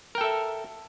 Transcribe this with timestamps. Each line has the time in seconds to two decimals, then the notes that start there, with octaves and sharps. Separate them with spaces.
0.15 A#4
0.18 G5
0.21 A4
0.24 E5